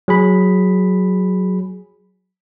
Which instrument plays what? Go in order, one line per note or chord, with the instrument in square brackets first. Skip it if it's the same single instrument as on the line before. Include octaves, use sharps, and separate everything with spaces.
[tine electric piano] F#3 G#4 B5